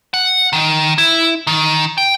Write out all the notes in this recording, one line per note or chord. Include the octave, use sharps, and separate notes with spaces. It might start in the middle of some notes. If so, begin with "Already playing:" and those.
F#5
D#3
E4
D#3
G5